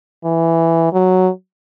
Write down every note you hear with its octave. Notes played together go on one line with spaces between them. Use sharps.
E3
F#3